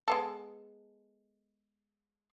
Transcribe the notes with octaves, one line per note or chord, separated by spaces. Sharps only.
G#3 B3 A4